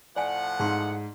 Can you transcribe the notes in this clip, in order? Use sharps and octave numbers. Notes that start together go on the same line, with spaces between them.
A2 F3 D5 F#5 G#5
G#2 D#4 C6